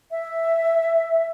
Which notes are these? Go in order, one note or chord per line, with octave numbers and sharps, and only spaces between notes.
E5